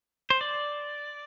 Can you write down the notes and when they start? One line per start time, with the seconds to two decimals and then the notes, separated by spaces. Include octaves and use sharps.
0.30 C5
0.41 D5